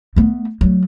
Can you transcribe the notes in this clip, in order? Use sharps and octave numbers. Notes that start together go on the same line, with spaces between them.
A3 B3
F#3 A3